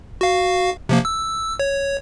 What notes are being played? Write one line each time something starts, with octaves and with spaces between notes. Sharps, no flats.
F#4 F5
C3 F3 A#3
E6
C#5